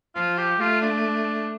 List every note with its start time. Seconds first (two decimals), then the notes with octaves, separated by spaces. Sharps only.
0.15 F3 F4
0.38 G4
0.60 A3 F4
0.82 D4